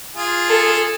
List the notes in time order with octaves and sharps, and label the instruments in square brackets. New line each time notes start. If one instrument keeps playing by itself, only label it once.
[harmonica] F4 G#4
[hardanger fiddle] A4